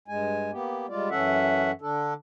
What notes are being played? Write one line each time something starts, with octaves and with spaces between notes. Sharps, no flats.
G2 G#3 G#5
A#3 B3 G4
G3 G#3 F4 D5
F#2 E3 C#4 A4 E5 F#5
D3 D4 A4